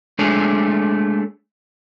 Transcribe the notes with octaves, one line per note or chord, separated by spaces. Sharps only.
G#3 A3 D4 G#4 A4 C#5